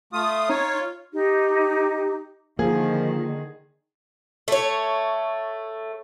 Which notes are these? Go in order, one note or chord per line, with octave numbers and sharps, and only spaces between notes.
A3 F4 D#6
D#4 C#5 A#5
D#4 G4
D3 D#3 F3 A#3 G#4
A3 C#5